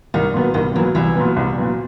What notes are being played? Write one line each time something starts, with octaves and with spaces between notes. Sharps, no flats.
C2 D#3
A#2 F#3 B3
C2 D#3
A#2 E3 F#3 B3
C2 E3
A#2 F#3 B3
C2
A#2 F#3 B3